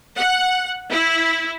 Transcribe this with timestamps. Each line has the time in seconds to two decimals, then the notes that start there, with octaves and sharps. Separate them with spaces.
0.16 F#5
0.89 E4